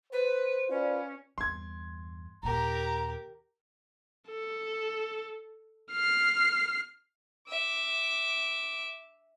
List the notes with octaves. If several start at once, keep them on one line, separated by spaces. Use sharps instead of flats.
B4 C5
C#4 F4 B4 D5
E2 G2 C6 G#6
D#2 A#2 G4 A#4 A#5
A4
F6 C7
E5 D6